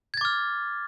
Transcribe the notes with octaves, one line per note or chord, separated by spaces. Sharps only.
D6 F6 G#6 A6